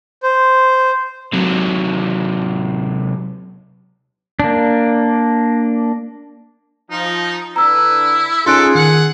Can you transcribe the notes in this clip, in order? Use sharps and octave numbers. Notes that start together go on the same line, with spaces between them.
C5
C3 F#3
A#3 D4
F3 D#4
D3 D4 E4 B4 A#5 E6
C#4 D#4 F4 G#4 A4 C6 F#6 D7
D#3 F#5